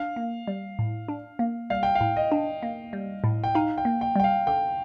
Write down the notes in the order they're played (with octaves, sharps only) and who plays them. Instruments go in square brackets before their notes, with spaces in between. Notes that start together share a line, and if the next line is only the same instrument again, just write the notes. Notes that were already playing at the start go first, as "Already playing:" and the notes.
Already playing: [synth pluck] D4 [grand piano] F5
[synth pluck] A#3
G3
A2
D4
A#3
[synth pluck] G3 [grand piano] F5
[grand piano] G5
F5
[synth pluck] A2
[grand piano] D#5
[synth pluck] D4
A#3
G3
A2
[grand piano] G5
[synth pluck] D#4 [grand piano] F5
[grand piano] G5
[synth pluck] A#3
[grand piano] G5
[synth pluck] G3 [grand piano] G5
[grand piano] F5
[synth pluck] D3 [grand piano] G5